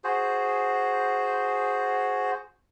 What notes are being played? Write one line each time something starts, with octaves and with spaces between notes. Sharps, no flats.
F#4 G#4 C5